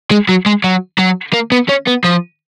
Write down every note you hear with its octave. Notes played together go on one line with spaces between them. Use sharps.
G#3
F#3
G#3
F#3
F#3
A#3
B3
C#4
B3
F3